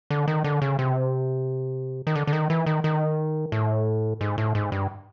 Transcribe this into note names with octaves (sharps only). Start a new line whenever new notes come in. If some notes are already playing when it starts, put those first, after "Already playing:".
D3
D#3
D3
C#3
C3
D#3
D3
D3
D#3
E3
D#3
D#3
A2
G#2
A2
G#2
G2